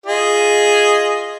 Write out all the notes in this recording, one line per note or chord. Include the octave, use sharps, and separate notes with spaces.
F4 G#4 D#5